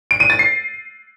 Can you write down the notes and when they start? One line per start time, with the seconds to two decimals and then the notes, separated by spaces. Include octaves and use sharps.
0.11 D7
0.20 D#7
0.30 A6
0.39 C7